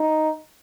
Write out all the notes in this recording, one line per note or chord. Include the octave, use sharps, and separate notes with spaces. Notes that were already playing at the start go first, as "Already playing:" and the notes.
Already playing: D#4